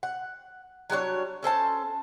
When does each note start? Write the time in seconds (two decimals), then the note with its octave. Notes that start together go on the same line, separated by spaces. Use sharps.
0.03 F#5
0.90 F#3 G3 D4 C#5
1.43 C#4 A4 C5 A5